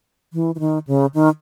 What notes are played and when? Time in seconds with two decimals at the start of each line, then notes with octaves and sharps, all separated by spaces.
0.33 E3
0.55 E3
0.60 D#3
0.87 C#3
1.14 D#3